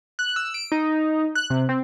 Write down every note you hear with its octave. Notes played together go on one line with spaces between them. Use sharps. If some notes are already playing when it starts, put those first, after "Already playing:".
F#6
E6
D7
D#4
F#6
C3
C4